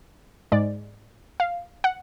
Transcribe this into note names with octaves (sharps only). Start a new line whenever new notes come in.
G#2 G#3 D5
F5
F#5